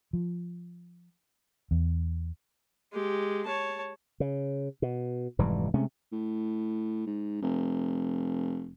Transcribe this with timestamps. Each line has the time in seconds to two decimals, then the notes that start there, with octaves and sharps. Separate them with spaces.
0.13 F3
1.71 E2
2.92 G#3 G4
3.46 C#5 A5
4.20 C#3
4.82 B2
5.39 F1 G#2 E3 G3
5.74 C3 G#3 A3 C#4
6.12 A2
7.06 G#2
7.42 F1